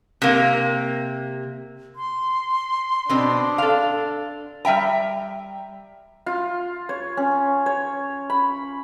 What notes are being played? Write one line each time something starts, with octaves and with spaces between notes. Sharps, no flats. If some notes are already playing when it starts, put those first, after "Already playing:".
C3 A#3
C6
B2 C4 D4
A4 F5
G3 E5 G5 A#5
F4
C#5
C#4
C#5
B5